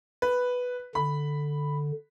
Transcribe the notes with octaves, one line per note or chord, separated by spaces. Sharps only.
B4
D3 B5